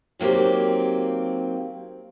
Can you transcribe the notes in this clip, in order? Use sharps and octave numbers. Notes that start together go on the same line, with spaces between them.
D#3 F#3 A#3 C4 G4